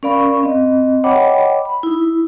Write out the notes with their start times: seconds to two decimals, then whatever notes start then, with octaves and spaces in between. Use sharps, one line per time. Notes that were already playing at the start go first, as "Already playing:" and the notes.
0.03 C#4 A#4 D5 F5 B5 C#6
0.43 C4 D#5
1.04 C#5 D#5 F#5 G5 B5 D6
1.65 B5
1.83 D#4 E4